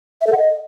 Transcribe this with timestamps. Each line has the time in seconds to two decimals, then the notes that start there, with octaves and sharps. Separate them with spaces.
0.21 E5
0.27 A4
0.32 F#5
0.38 D#5